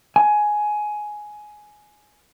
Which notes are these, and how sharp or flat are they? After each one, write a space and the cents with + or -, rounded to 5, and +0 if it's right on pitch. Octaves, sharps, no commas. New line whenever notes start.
G#5 +10